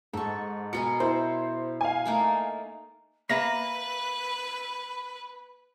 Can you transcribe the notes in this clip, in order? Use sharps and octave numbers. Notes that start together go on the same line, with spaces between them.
G#2 A4 C#6
B2 A#4 G#5 C#7
E4 C5
F5 G#5
A3 A#3 D#4
A#3 B4 E5 A#5 B5 A#6